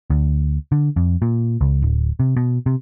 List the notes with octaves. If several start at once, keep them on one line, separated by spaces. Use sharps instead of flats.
D2
D3
F2
A#2
C#2
D1
C3
B2
C3